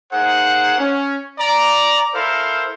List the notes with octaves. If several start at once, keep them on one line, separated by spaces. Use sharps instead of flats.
A#3 D#4 G#4 C5 F#5
C#4
D5 A#5
E4 A4 A#4 C5 F5 C6